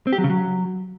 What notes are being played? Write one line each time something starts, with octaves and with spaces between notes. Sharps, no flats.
C4
G4
F#3
C#3
F#3